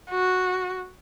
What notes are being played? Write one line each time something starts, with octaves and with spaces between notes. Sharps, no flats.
F#4